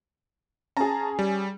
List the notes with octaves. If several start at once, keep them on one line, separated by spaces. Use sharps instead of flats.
C#4 G#4 A5 A#5
G3